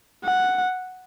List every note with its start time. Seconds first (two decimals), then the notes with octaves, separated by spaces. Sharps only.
0.24 F#5